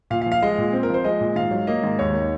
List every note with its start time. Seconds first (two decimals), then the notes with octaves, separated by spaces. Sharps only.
0.10 A#2 F5
0.22 F5
0.26 F3
0.32 F5
0.42 G#3 D#5
0.58 A#2
0.73 C4
0.83 A#4
0.90 F3 C5
1.04 G#3 D#5
1.21 A#2
1.36 G#2 F5
1.51 F#3
1.67 A#3 D#5
1.83 G#2
1.99 D#2 C#5
2.14 D#3